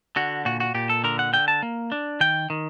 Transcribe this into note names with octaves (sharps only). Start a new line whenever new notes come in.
D3 F#4
A#2 F#4
F#4
A#2 G4
A4
D3 A#4
F#5
D3 G5
A5
A#3
D4
D#3 G5
D#3